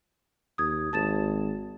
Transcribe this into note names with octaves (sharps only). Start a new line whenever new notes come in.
D#2 D#6 G#6
G#1 A5 A6 E7